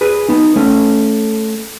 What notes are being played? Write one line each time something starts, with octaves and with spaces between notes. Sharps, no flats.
G#4 B4
B3 D#4
A3 C#4